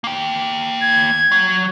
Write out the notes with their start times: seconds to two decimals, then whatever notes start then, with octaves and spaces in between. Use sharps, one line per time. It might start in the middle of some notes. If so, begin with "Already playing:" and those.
0.04 A#3 G5
0.81 G#6
1.32 F#3